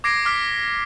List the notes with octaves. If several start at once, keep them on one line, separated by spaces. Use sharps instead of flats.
D6 G#6 A#6 C7 D7
D6 F6 B6